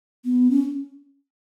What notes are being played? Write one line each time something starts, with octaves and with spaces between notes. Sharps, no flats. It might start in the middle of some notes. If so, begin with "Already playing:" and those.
B3
C#4